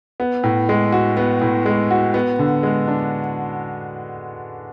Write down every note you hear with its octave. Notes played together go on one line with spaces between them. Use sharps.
B3
A2
G#3
F#4
B3
A2
G#3
F#4
B3
D3
G#3
D4